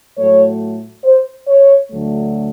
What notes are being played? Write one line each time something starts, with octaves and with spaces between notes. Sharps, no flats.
A2 F#3 A3 C#5
C5
C#5
D2 D3 F#3 A3